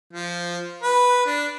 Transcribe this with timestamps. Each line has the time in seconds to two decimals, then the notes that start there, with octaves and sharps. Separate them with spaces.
0.13 F3
0.82 B4
1.26 D4